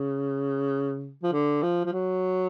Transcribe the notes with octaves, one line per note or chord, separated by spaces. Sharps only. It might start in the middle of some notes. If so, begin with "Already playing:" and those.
Already playing: C#3
F3
D3
F3
F3
F#3